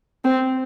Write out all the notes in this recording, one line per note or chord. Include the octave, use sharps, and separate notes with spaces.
C4